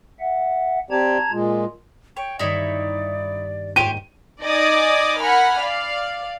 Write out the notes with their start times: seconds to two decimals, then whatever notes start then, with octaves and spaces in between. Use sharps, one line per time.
0.20 E5 F#5
0.91 C4 G4 D5 A5 A#5 G#6
1.32 A#2 G#3 F4
2.17 C#5 G5
2.39 G2 D#3 D#4 E4 C#5 D5
2.67 G4
3.76 G#2 A#3 G4 C5 C#5 D#7
4.43 D#4 D5 D#5 G#5 D6 D#6
5.19 A#4 F#5 G#5 B5 F6
5.60 D5 F5